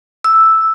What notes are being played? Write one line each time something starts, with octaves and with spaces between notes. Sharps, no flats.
E6